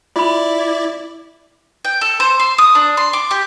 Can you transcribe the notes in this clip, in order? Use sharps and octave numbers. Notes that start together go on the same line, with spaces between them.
E4 F4 D5 B5
G5
A4
C5
C6
D#6
D4
C6
D6
G4